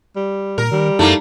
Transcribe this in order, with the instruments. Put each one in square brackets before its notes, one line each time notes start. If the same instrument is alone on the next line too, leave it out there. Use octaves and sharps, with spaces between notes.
[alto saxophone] G3
[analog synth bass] A#2 [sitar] A#4
[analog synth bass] D#3 [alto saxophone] G3
[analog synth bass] F#2 [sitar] A3 A#3 [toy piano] D#4 E4